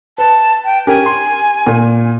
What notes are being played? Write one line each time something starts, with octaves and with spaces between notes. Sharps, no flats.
B4 A5
G5
C#4 G4 A#4 G#5
C6
A#2